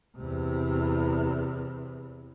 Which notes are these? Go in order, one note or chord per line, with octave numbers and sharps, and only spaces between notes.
E2 C3